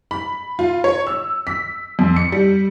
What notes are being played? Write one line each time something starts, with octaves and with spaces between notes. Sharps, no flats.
B5
F4
C#5
E6
B6
F2
C#7
G3